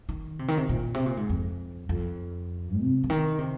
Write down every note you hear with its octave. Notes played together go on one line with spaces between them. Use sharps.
D#3
C3
D#3
C3
A#2
C3
A#2
G#2
F2
F2
C3
C3
D#3
C3